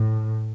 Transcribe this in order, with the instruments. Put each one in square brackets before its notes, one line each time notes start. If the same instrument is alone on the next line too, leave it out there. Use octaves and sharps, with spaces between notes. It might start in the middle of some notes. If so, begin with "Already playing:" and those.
Already playing: [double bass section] A2